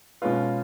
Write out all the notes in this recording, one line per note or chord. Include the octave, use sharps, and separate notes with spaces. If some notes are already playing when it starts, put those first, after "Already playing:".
B2 G#3 C#4 F4 B4